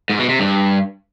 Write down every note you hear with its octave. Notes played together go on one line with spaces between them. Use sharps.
G#2
B2
C3
G2